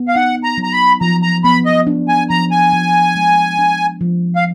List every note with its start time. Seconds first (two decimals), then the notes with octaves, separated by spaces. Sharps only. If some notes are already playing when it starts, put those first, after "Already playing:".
Already playing: B3
0.08 F5
0.15 D#4 F#5
0.44 A#5
0.58 F#3
0.63 A#5
0.73 B5
1.01 F3 A#5
1.22 A#5
1.44 B3 B5
1.66 D#5
1.87 D4
2.08 G#5
2.30 F3 A#5
2.51 G#5
2.73 F3
3.16 G#3
3.58 D4
4.01 F3
4.36 F5